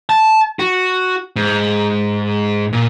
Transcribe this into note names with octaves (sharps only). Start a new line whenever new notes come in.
A5
F#4
G#2
A#2